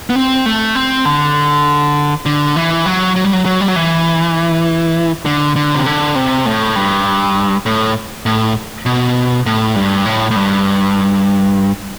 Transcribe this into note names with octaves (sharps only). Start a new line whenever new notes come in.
B3
C4
A3
C4
D3
D3
E3
F#3
F#3
G3
F#3
F#3
G3
F#3
E3
D3
D3
C3
D3
C3
A2
G2
A2
A2
B2
A2
G2
A2
A2
G2